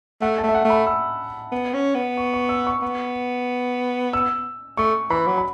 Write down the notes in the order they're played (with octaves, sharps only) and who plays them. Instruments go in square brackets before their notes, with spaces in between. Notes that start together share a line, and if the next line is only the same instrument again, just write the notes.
[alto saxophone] A3 [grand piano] F#5
[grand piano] A5
[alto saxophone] A3 [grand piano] E5
[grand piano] F#5
[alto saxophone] A3
[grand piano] B5
E6
[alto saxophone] B3
C#4
B3
[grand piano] C#6
C#6
E6
C#6
[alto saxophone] B3
[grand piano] E6
[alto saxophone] A3 [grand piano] C#6
[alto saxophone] E3 [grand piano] B5
[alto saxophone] F#3
[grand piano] B5